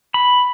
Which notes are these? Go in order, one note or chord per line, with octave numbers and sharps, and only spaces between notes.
B5